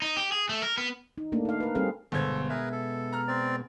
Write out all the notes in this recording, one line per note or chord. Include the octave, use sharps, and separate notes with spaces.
D#4
G4
G#4
A3
A#4
B3
D#4
A3 A#3 D4
D#4 F5
A#4 B4
G3 C4 G#4 A4 B4 F5
G1 B2 G#3 B3 A4 C5 G#6
G#4 A#4 B4 E5
A4
A#5 F6
C4 D5